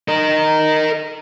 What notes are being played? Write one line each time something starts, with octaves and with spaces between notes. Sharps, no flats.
A#4 D#5